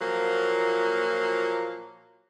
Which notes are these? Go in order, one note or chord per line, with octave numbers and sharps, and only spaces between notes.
A#2 F3 F#3 A#3